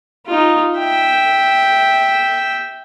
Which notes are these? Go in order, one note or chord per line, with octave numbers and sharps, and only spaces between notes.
D#4 F4
E5 G5